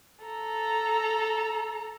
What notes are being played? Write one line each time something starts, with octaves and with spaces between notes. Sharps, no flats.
A4 A#5